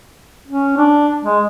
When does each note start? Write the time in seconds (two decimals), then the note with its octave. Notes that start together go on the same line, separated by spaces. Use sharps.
0.48 C#4
0.77 D4
1.25 G#3